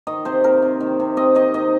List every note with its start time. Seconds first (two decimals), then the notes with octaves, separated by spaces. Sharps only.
0.07 D#3 D#5
0.25 C3 C5
0.44 C4 A#4
0.62 C3
0.80 D#3
1.00 C3
1.17 C4 D#5
1.35 D#3 D#5
1.54 D#3 D#5